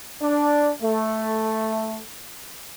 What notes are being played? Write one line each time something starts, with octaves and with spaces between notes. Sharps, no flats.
D4
A3